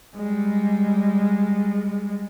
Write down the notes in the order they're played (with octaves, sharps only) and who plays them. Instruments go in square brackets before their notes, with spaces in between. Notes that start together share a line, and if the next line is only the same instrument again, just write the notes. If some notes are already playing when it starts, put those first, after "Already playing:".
[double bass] G3 G#3